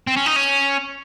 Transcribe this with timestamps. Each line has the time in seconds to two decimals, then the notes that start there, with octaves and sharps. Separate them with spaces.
0.07 C4
0.17 C#4
0.26 D#4
0.36 C#4